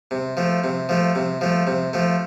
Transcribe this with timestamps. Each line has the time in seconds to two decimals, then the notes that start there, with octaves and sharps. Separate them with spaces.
0.11 C3
0.37 F3 A3
0.64 C3
0.89 F3 A3
1.15 C3
1.41 F3 A3
1.67 C3
1.93 F3 A3